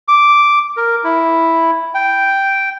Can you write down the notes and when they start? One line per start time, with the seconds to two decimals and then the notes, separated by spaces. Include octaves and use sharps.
0.08 D6
0.77 A#4
1.04 E4
1.94 G5